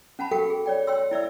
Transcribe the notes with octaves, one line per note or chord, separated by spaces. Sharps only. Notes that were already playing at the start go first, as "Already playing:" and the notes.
C#4 F#5 A5 B5
F#4 G4 A4 A#4 F5 G5
G#4
C#5 D5 G5
C#5 G5 C6 E6
E4 D5 E5 E6